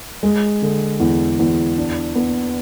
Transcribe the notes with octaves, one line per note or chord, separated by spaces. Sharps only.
G#3
D3
E2
E2
D4
B3